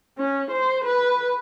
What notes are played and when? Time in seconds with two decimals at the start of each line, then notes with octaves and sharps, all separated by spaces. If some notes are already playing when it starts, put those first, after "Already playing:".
0.18 C#4
0.51 C5
0.85 B4